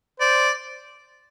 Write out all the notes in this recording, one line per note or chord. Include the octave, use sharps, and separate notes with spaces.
C5 D5